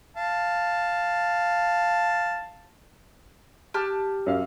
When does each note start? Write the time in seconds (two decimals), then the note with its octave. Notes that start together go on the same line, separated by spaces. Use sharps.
0.17 F5 A5
3.74 G4 A5 F6
4.26 F#2 F5